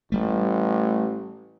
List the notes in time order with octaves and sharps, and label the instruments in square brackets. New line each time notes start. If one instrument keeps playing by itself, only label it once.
[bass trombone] A1 [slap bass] G3 A3